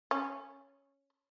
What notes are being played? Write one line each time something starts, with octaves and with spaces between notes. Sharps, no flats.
C#4